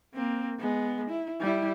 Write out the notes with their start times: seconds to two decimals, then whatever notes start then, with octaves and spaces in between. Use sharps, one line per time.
0.14 A#3 C4
0.60 G#3 B3
1.10 E4
1.40 G3 E4